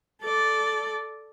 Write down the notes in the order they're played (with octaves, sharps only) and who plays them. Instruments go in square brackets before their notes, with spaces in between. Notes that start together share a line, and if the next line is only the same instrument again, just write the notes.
[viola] A4 D5